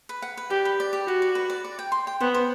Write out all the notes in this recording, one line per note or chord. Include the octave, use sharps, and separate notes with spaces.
B4
F#5
B4
G4 D5
B4
D5
G4
F#4 D5
D5
B4
D5
D5
G5
C6
G5
B3 C5
C5